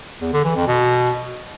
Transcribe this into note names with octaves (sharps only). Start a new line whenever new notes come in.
E2
D3
E3
F2
B2